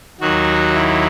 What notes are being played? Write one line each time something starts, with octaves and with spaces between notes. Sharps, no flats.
D#2 D#3 F#3 F#4
E4